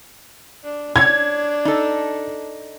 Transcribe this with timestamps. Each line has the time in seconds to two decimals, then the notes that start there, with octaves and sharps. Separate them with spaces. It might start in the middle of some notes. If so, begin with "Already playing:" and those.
0.63 D4
0.96 D4 C#5 G#6
1.65 D#4 A4